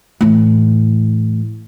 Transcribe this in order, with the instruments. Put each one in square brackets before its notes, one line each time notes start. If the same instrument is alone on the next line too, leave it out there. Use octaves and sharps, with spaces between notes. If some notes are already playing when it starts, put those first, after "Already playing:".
[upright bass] A2 E3